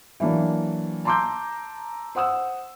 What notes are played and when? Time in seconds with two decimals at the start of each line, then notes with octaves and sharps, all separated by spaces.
0.20 E3 F#3 A#3 D4
1.05 A5 A#5 C6 D6 E6 G6
2.15 C5 F#5 D#6 E6